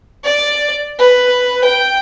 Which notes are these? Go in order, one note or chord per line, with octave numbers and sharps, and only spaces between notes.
D5
B4
G5